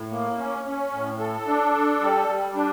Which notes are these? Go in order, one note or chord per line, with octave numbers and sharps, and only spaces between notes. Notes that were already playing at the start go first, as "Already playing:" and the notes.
Already playing: A2
A#3
C#4
C#4
A2
A4
D4
A4
G3
G3
D4